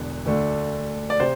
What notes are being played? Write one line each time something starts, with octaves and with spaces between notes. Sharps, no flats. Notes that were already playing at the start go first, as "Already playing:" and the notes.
Already playing: E1 E2 D3
D2 D3 A3 D4
D5
C3 C5